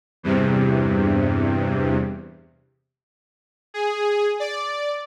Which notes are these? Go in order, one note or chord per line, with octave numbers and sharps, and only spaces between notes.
E2 G2 C3
G#4
D5